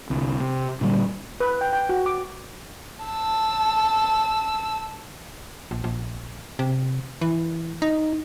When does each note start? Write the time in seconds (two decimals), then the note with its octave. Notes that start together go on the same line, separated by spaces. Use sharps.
0.10 C2 D3
0.40 C3
0.81 A#2 D3 F3 G3
1.40 B4
1.61 G5
1.73 G5
1.89 F#4
2.06 D6
3.05 A5 E6
5.71 A#1
5.84 A#1
6.59 C3
7.21 E3
7.82 D#4